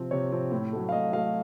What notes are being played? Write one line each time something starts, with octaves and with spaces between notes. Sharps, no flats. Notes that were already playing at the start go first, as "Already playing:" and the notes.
Already playing: C3 F3 C4
C3 C#5
F3 C4
A2
F#3 A3
F5
A2 D#5
F#3 A3 F5